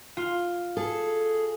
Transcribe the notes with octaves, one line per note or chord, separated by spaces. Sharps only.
F4
G#4 A4